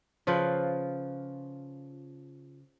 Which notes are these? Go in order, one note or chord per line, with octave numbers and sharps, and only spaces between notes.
C#3 F3 F4 B4